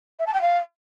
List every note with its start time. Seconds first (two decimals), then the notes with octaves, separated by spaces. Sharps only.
0.19 E5
0.26 A5
0.34 G5
0.41 F5